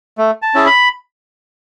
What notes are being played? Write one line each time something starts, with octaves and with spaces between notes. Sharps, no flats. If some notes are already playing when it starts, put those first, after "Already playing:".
A3
A5
C#4 E4 G#4
B5